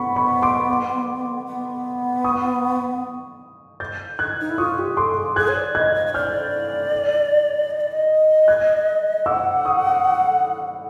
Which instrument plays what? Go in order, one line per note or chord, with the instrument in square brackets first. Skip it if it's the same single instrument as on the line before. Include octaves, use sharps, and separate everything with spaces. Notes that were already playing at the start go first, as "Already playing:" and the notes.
Already playing: [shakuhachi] B3 [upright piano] F#5 B5 C#6
[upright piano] B5 C#6
C6 D6
[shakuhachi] B3
[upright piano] C#6 D#6
G6 A6
F#6 G#6
[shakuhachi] D#4
E4
[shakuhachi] F4 [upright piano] C#6 D#6
[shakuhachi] G4
[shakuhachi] A4 [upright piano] C6 D6
[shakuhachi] G#4
[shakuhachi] G#4 [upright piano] F#6 G#6
[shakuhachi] C#5
D5
[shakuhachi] D#5 [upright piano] F#6 G#6
[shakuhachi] D#5
D#5
[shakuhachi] D5 [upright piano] F6 G6
[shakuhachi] D#5
D5
D#5
[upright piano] F#6 G#6
[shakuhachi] F#5 [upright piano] D6 E6
[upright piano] C#6 D#6